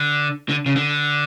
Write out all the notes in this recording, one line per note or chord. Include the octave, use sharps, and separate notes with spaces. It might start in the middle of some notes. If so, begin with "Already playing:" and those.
Already playing: D3
D3
C#3
D3